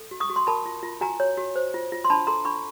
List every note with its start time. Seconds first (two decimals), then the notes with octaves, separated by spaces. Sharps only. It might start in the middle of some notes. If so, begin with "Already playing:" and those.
Already playing: A4
0.11 F#4
0.20 C#6 D#6
0.30 F#4
0.36 C6
0.47 A#4 A5 B5
0.66 F4
0.83 F4
1.01 F#4 G#5 A#5
1.20 C#5
1.38 F#4
1.56 C5
1.74 F4
1.92 F4
2.04 C6
2.10 D4 A5 B5
2.27 A4 A#5 C6
2.45 D4 B5 C#6